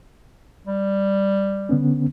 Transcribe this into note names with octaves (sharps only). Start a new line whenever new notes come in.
G3
D3 B3 C#4